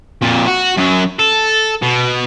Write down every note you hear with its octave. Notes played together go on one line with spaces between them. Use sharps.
F2 A#2
F#4
F#2 F#3
A4
B2